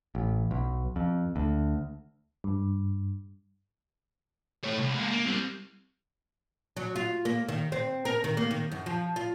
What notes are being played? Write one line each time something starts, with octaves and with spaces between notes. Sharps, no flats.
A1
B1
F2
D2
G2
A3 C#5
C2
G#3 A#3
A#3
G3 C4
F#3
F4
A#3
D#3
C4
A#4
D#3
A#3
D#3
F#2
F3
F4